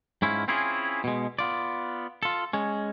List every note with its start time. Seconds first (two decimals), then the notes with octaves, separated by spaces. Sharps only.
0.22 G#2 C#4 E4 F4
0.48 C4 C#4 E4 F4 G#4
1.04 B2 G#3
1.39 B3 F4 D5
2.23 F4 A4
2.53 G#3 C#4